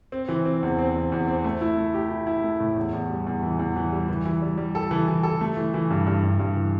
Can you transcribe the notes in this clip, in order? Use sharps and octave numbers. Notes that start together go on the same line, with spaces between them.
C4
E3
C4
E2
C4
E2
E2
C4
A3
E4
A3
G4
E4
E4
A3
A2
E2
E2
G3
E2
E3
E2
E3
G3
E3
E3
G3
G3
A4
E3
E3
A4
A3
E3
E3
G2
G2
G2
G2
E3